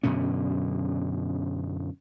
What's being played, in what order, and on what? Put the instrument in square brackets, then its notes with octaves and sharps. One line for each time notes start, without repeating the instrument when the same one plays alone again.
[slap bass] F#2 B2 D3 C#4